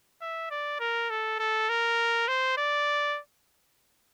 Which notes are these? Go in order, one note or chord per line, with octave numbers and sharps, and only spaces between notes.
E5
D5
A#4
A4
A4
A#4
C5
D5